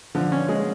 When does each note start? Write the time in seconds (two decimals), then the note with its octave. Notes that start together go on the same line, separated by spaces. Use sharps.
0.15 D3 F3
0.32 C#4
0.49 G#3